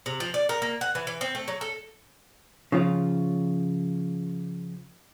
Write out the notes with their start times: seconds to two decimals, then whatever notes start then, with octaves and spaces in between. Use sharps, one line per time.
0.06 C3
0.20 F3
0.34 D5
0.49 A#4
0.62 A#3
0.81 F#5
0.95 E3
1.07 E3
1.21 C4
1.35 A3
1.48 F#3
1.61 A4
2.72 C#3 F3 F4